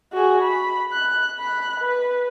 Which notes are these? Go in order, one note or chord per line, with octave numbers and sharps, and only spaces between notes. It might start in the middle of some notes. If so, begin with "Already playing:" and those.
F#4 G#4
B5
F#6
B5 F#6
B4